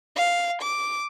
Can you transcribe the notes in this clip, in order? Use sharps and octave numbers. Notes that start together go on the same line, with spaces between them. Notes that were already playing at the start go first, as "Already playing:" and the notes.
F5
D6